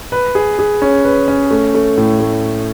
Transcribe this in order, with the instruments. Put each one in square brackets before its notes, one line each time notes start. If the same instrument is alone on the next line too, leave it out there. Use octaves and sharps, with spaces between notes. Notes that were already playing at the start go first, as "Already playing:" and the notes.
[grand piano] B4
G#4
G#4
C#4
B4
C#4
A3
A3
A2
A3